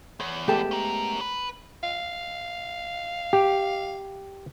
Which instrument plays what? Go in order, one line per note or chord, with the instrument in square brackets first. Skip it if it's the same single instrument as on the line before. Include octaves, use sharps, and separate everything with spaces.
[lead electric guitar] E2 [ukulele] C#5
[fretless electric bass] G#3 A3 B3 [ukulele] G4 A4 A5
[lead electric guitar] C#4 A#4
B4
[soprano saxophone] F5
[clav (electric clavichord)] G4